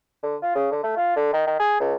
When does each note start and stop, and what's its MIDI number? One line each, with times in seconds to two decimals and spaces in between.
0.23 0.36 50
0.42 0.54 65
0.55 0.67 49
0.71 0.82 50
0.83 0.93 57
0.97 1.12 65
1.16 1.30 50
1.33 1.46 51
1.47 1.55 51
1.60 1.76 68
1.80 1.94 37